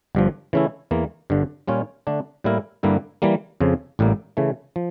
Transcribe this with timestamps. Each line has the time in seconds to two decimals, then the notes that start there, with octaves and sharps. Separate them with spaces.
0.15 G1 G2 F3
0.53 C#3 E3 A3 C#4 E4
0.91 E2 E3 A#3
1.30 G1 G2 D3
1.67 A#2 G3 C#4 F4 C#5
2.07 D3 A3 D4
2.44 A2 G3 A#3 E4 A#4
2.83 G2 D3 G3 A#3 E4
3.22 E3 G3 A#3
3.61 F2 C#3 F3
3.99 A1 A2 G3 A#3
4.37 C#3 E3 A3
4.76 F3